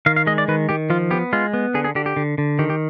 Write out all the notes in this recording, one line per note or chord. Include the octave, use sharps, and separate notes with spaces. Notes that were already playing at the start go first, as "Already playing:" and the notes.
D#3 F5
F5
G#3 D#5
D5
D#3 B4
D#3 G4
F3 F4
B3 G4
G#3 F4
B3
D3 G#4
G#4
D3 G4
G4
D3
D3
D#3 G4
G4